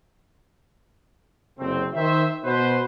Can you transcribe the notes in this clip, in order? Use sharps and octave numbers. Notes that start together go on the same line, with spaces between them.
F#1 C3 A3 C4
D#3 C5 E5
B2 B4 C5